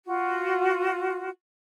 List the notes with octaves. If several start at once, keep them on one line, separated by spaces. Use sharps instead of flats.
F4 F#4